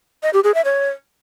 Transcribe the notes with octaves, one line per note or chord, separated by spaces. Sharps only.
D#5
G4
G#4
E5
C#5